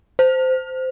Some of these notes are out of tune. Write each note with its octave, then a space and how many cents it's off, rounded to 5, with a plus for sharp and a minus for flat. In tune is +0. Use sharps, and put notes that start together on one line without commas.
C5 -15